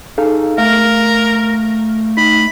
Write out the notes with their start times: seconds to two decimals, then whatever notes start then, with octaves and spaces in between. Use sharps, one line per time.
0.18 D#4 G#4 A4 F5
0.58 A3 A#4 F5
2.17 D#4 B5